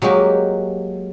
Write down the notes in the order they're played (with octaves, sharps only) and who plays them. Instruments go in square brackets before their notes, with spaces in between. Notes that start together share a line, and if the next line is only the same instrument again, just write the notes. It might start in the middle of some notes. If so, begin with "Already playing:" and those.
[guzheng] F#3 G#3 A#3 F#4 G4